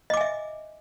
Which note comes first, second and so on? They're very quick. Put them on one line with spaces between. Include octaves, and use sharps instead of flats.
D#5 D6 G#5 E5